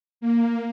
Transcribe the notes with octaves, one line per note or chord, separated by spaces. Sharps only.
A#3